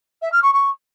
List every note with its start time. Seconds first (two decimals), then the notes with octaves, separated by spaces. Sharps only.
0.22 E5
0.32 F6
0.43 C#6
0.53 C#6